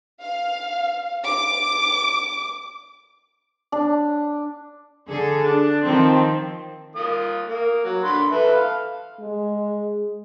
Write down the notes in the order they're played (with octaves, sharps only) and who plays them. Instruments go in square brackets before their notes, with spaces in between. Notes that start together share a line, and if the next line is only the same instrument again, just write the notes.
[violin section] F5
D6
[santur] D4
[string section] D3 G#4 A4
D4
D#3 F3 C4
[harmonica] A#3 F4 D#6
A#3
F#3
D3 B5 C6
A4 B4 E5
F5
[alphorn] G#3